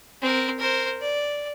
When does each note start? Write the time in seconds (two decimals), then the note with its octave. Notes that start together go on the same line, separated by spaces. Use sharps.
0.22 C4 A#4
0.59 A#4 C5
1.01 D5